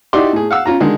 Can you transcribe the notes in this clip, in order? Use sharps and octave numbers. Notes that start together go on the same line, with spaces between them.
D#4 E4 F#4 G4 D5 C6
A2 G#4
F5 F#5 E6
C#4 F4 A#5
D3 D#3 G#3